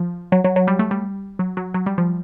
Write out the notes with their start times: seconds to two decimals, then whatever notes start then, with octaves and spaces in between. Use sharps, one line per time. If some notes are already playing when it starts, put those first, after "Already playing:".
Already playing: F3
0.32 F#3
0.44 F#3
0.56 F#3
0.67 G3
0.79 A3
0.91 G3
1.39 F#3
1.57 F#3
1.74 F#3
1.86 G3
1.98 F3